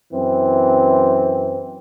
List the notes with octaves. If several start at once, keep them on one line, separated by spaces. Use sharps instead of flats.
F#2 E3 C4